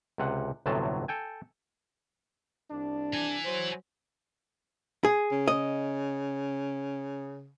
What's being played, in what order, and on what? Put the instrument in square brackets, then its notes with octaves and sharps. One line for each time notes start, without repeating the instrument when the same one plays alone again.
[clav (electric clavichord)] C#2 C3 F#5
G1 D2 A2 C3 F#3 A5
A4 G5 G#5
[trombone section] C2 D4
[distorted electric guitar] E3 G#5
[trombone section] F#3 C5
[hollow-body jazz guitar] G#4
[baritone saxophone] C#3
[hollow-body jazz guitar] D#5